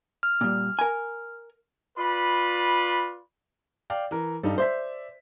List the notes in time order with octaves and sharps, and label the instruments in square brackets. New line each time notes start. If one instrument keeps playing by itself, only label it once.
[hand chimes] F6
[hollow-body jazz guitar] A#2 G3
A#4 G#5
[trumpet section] F4 B4 D5 B5
[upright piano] D5 F5 G5
E3 A#4
[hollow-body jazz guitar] G2 [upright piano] G3 D#4 A4
[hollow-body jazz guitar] C5 [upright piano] D5 E5 B6